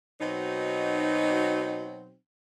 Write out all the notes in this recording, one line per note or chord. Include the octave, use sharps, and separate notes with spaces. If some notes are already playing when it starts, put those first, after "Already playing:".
B2 F#3 C4 D#4